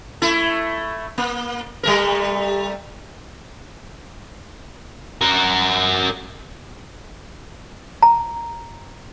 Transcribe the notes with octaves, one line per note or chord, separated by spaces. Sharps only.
A3 E4
A#3
G3 A3 A#4
F#4 A#4
A#5